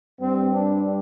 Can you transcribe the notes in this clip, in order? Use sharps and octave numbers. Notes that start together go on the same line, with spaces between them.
G2 G3 C4
D4